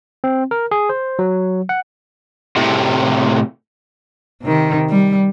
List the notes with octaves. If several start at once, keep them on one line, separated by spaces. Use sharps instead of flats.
C4
A#4
G#4
C5
F#3
F#5
A2 C3
C3 D#3
G3